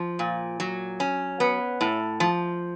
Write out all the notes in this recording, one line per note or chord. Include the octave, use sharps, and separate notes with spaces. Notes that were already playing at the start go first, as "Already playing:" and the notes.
Already playing: F3
A#2
F#3
C#4
B3
A2
F3